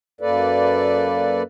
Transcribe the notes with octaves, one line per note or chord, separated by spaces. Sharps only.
F#2 A#3 A4 B4 D5